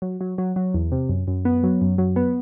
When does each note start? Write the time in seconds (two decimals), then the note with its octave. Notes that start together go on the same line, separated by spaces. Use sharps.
0.02 F#3
0.21 F#3
0.38 F#3
0.56 F#3
0.74 E2
0.92 C3
1.09 F#2
1.28 F#2
1.45 B3
1.64 F#3
1.81 F#2
1.98 F#3
2.16 B3